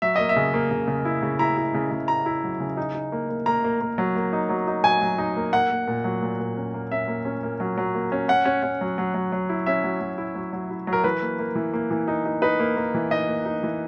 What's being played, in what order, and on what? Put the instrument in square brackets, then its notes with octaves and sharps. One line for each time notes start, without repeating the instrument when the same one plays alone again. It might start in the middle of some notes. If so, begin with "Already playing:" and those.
[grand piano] F#3 E5
A#3 D#5
E5
C#3
A#3
C#3
C#3
E4
C#3
E4 A#5
E4
C#3
C#3
E4 A#5
E4
F#3
C#3
D#4
D#4
A#3
A#3
A#3 A#5
A#3
A#3
F#3
A#3
D#4
F#3
D#4
F#3 G#5
F#3
D#4
A#3
A#3 F#5
A#3
A#2
F#3
A#2
A#2
C#4
A#3
C#4 E5
A#3
C#4
A#3
F#3
F#3
A#3
C#4
C#4 F#5
C#4
C#4
F#3
F#3
F#3
F#3
E4
C#4 E5
F#3
F#3
E4
F#3
F#3
E4
F#3
A#4
E3 B4
A#3
A#3
E3
A#3
E3
D#4
D#4
D#4 B4
A#3
A#3
E3
D#4 D#5
A#3
D#4
E3